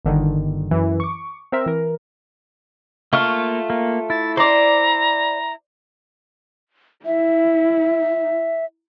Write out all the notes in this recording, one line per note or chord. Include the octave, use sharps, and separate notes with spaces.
G1 D3 D#3
F#2 E3
C#6 D6
C4 A#4 E5
E3 A#4
A3 A#3 F4 C#6 F6
A#3
E4 A6
C5 D5 A#5
E4 E5